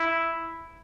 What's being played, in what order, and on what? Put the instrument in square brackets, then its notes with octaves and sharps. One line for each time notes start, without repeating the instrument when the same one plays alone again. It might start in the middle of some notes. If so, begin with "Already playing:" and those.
Already playing: [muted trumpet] E4